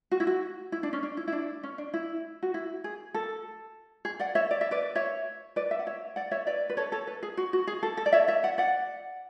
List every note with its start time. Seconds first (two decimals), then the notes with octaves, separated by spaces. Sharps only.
0.11 F#4
0.20 E4
0.27 F#4
0.72 E4
0.83 D4
0.93 C#4
1.03 D4
1.17 E4
1.28 E4
1.32 D4
1.63 C#4
1.78 D4
1.94 E4
2.43 F#4
2.54 E4
2.84 G#4
3.14 A4
4.05 G#4
4.20 D5 F#5
4.35 C#5 E5
4.51 D5
4.61 E5
4.71 B4 D5
4.95 C#5 E5
5.56 B4 D5
5.71 E5
5.79 F#5
5.87 C#5 E5
6.16 D5 F#5
6.31 C#5 E5
6.47 B4 D5
6.70 B4
6.77 A4 C#5
6.92 A4 C#5
7.07 B4
7.23 G#4
7.37 F#4
7.53 F#4
7.67 G#4
7.83 A4
7.97 A4
8.06 D5
8.13 C#5 E5
8.28 C#5 E5
8.43 D5 F#5
8.58 D5 F#5